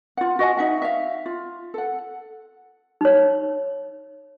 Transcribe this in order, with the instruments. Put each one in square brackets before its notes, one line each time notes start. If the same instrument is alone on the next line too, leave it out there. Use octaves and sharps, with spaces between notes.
[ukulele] F4 F#5
F#4 D#5 F#5 G#5
D#4 E5 F#5
E5 F5
F4
A4 F#5
[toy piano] D#4 C#5